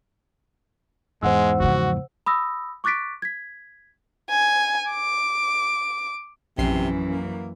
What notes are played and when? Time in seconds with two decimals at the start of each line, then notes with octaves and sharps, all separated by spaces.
1.23 E2 G#2 G#3 C5 F#5 E6
1.60 C#3 F3 F#4
2.26 B5 D#6 E6 A#6
2.84 C#6 D6 F#6 A6 B6 D7
3.22 G#6 B6
4.30 G#5
4.90 D6
6.58 A#1 F#2 C3 E3 C#4 C7
7.06 A#3